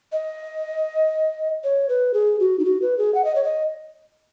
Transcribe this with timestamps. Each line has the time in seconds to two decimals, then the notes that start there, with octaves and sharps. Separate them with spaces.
0.12 D#5
1.64 C#5
1.89 B4
2.14 G#4
2.40 F#4
2.59 D#4
2.65 F#4
2.82 B4
2.98 G#4
3.14 F#5
3.24 D#5
3.35 C#5
3.44 D#5